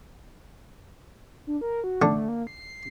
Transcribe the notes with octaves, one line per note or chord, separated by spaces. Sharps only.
D4
A#4
F#4
D3 A3 D4
A#3
C7